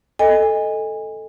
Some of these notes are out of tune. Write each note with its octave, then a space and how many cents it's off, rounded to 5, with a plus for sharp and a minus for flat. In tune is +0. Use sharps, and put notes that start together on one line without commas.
A4 +0 D#5 +0 G#5 -25